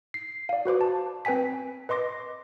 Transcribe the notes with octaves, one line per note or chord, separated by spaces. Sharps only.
C7
D5 F5
F#4 B4 C5 D6
A5
C4 B4 G5 G#5 B6
B4 D#5 C6 D6 A#6